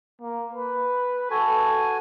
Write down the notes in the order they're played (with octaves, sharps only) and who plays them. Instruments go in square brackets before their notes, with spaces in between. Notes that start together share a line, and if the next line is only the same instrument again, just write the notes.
[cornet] A#3
B4
[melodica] F#4 G#5 [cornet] A4